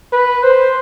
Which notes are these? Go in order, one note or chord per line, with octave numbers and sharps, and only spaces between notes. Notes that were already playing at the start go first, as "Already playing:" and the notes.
B4
C5